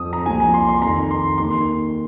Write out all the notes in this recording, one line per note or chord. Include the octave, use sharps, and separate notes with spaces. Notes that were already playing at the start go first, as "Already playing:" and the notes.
Already playing: F2 F3 D#6
A#5
C2 A#2 F3 G#5
A#5
C6
C6
F2 D#3 A#5
C6
D#2 D#3 C6